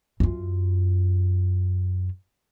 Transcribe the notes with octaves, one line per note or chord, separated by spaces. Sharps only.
F#2 F4